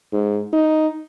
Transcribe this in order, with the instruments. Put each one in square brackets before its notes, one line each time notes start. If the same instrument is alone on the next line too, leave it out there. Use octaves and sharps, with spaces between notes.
[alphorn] G#2
D#4